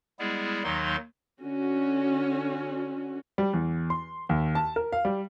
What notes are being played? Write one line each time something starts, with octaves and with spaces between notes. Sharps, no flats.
G3 G#3 B3 E4 G#4
D#2 D#3 F#3 A#3 D#4 C6
D3 C#4 F#4
G3
E2
C6
D#2
A5
A#4
F5
G3